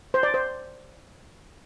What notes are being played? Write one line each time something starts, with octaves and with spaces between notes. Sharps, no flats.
C5
D5
C5